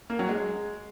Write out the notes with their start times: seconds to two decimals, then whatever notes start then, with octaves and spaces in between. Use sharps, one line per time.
0.10 A#3
0.19 F#3
0.29 G#3